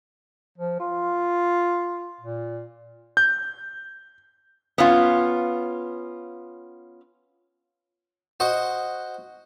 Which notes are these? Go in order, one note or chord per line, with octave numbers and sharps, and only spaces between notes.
F3
F4
A#2
G6
B3 C#4 F4
F#4 C5 D#5 F#5